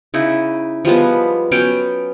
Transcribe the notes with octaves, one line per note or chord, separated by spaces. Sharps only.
C#3 D#4 E4
F3 G3 G#3 B3
F#3 B3 C#4 G5